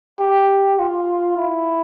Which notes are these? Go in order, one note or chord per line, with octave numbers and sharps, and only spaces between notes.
G4
F4
E4